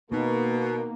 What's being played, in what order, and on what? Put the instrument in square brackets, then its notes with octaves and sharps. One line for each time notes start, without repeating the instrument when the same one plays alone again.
[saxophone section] B2 [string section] A#3 [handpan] B3 D#4